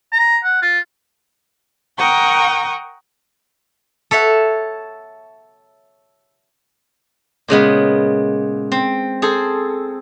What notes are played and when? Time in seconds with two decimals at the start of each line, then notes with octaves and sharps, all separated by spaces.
0.12 A#5
0.44 F#5
0.62 F4
1.98 A#4 F#5 G5 A#5 C#6 D#6
4.11 A4 C#5 E5 F#5
7.48 A#2 C#3 G#3 B3
8.72 C4
9.22 G#4 A4 C5